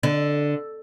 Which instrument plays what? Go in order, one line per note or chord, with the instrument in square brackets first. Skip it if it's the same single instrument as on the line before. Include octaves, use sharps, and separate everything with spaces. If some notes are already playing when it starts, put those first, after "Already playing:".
[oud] D3